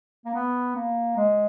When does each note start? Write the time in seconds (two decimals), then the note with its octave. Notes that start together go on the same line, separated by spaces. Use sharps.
0.26 A#3
0.34 B3
0.76 A#3
1.16 G#3